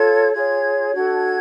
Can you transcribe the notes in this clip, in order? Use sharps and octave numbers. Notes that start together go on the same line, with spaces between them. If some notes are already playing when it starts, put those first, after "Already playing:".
Already playing: F4 A4 C#5 G#6
F4 G#4 C#5 G#6
D4 F#4 A4 G#6